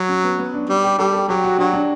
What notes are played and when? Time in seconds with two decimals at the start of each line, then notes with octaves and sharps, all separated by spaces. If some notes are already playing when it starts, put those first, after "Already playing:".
Already playing: F#3
0.09 C#4
0.24 B3
0.39 B3
0.54 D4
0.69 G3
0.84 G4
0.99 G3 A4
1.13 A4
1.29 F#3 G4
1.44 F#4
1.58 F#3 D4
1.73 D4